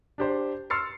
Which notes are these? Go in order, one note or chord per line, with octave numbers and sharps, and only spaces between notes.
D4 G4 C5
C6 E6 F6 A6 C7 C#7